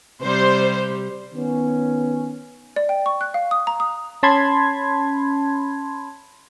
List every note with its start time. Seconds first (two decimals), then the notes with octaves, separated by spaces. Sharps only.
0.21 C3 G3 C5
1.33 D#3 B3 C#4
2.76 D5
2.89 G5
3.06 C#6
3.21 F#6
3.34 F5
3.51 D#6
3.67 A#5
3.80 D#6
4.23 C#4 A5 B5 C6 G#6